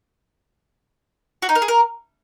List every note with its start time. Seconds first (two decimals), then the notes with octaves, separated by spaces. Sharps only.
1.42 F#4
1.49 D#4
1.55 A#4
1.62 G#4
1.68 A#4